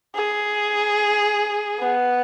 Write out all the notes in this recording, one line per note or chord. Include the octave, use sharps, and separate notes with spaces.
G#4
B3